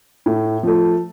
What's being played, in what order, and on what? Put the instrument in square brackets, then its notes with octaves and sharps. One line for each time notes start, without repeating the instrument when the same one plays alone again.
[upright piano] A2
F3 A3